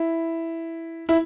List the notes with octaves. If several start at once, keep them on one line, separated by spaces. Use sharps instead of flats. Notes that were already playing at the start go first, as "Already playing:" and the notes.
Already playing: E4
E4